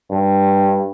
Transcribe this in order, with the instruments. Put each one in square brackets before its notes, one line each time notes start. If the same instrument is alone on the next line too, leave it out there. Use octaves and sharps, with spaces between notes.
[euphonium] G2